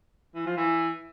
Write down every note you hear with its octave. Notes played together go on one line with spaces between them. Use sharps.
E3
F3
E3